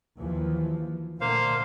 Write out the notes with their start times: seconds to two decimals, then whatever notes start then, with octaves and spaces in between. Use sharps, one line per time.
0.18 D#2 E3 F3
1.21 A#2 D3 A3 A#3 C5 F5